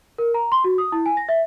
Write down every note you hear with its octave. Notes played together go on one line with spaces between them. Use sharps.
A#4
A#5
C6
F#4
D#6
E4
G#5
A#6
E5